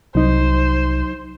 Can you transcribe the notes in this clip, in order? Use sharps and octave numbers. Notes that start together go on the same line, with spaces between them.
C2 F#3 D#4 C5